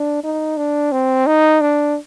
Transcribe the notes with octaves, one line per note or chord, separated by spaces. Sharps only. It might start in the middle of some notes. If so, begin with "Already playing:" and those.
Already playing: D4
D#4
D4
C4
D#4
D4